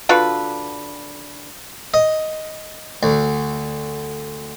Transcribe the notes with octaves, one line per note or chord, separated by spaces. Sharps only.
D3 F4 F#4 B4
D#5
D2